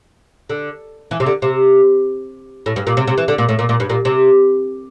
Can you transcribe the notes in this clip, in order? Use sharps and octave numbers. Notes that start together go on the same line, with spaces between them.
D3
E3
C3
D3
C3
A2
G2
A#2
C3
C3
E3
D3
A#2
A2
A#2
A#2
G2
A#2
C3